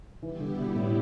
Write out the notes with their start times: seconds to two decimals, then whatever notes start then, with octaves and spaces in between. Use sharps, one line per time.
0.22 E3 G3 B3 E4 G4
0.40 D3
0.57 B2
0.75 A2